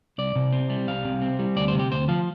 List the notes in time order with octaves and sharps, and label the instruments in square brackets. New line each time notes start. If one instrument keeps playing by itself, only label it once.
[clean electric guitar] C2 D5
C3
C4
G3
C2 F5
C3
C4
G3
D2 D5
C5
C3
G4
D2 C5
F3 F5